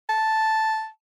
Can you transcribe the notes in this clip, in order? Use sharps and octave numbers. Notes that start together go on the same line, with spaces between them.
A5